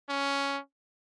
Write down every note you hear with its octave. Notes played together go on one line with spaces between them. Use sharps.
C#4